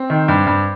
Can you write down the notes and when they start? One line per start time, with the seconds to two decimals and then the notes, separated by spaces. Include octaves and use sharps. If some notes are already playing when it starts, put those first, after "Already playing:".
Already playing: C4
0.10 D#3
0.28 G2
0.46 G2